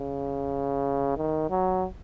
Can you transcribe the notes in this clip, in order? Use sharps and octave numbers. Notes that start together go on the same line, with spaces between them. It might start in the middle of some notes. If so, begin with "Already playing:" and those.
Already playing: C#3
D#3
F#3